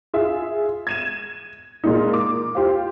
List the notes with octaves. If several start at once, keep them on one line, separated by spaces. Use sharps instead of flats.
F4 G#4 E5
G#6 D#7 E7
A#2 G#3 A#3 D4 D#4
D6
F4 G4 C5 F5